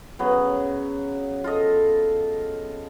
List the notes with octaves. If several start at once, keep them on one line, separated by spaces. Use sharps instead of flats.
C#3 F#3 B3
F4 A4 D#5